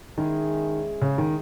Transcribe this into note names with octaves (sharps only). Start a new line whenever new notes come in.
D#3 G#3 C#4 E4 G#4
C#3
D#3